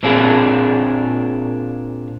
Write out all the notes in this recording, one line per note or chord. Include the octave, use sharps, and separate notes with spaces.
A#2 C4 D4 F4 G#4